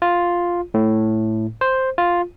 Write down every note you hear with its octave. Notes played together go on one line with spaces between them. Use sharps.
F4
A2
C5
F4